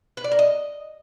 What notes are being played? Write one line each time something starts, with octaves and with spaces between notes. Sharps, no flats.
B4
D5
A#4
D#5